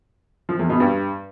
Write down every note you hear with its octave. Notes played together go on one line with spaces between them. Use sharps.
F3
E2
B2
G2